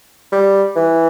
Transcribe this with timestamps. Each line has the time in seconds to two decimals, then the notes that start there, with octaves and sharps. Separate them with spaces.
0.32 G3
0.76 E3